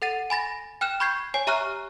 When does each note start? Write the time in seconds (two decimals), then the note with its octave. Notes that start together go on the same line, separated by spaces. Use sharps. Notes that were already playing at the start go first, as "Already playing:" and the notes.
0.02 A4 F#5 A6 D#7
0.30 G#5 B5 A6 A#6
0.81 G5 F6 F#6 E7
1.00 B5 C#6 G6 G#6 C7
1.34 C#5 G#5 C7
1.47 G4 E5 A#5 C#6 F6 F#6